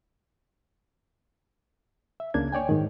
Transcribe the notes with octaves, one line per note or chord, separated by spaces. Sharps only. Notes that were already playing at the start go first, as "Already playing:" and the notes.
E5
C#2 C#3 A#3 D4 G#6
C#5 D5 G5 G#5
G#2 D#3